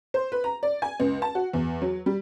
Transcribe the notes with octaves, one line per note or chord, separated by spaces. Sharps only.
C5
B4
A#5
D5
G#5
C#2
A5
F#4
E2
F#3
G3